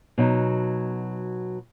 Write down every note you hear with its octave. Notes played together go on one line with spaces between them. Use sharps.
B2 F#3 D#4